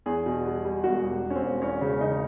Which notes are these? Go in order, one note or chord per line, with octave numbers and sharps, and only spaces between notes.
E2 G#4
B2
G3
G3
E1 F#4
E1
E1
C#4
C4
E1
E2 C#4
C#3
C#3 D#4